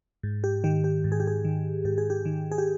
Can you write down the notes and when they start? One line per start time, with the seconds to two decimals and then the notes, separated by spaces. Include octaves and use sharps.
0.23 G#2
0.44 G4
0.64 D#3 G4
0.84 G4
1.04 G#2
1.12 G#4
1.20 G4
1.27 G#4
1.45 D#3
1.85 G#2 G4
1.98 G#4
2.10 G4
2.25 D#3
2.52 G#4
2.58 G4